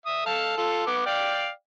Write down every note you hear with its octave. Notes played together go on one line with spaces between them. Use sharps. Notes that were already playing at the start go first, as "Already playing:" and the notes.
E5 D#6
A4 F5 A5
F4 A4
B3 D6
D5 F5 G5